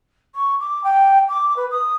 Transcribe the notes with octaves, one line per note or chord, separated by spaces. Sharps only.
C#6
D6
G5
D6
B4
D#6